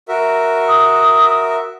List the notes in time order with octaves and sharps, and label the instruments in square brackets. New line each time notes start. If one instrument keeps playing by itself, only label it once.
[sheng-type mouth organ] F#4 A#4 E5
[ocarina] D#6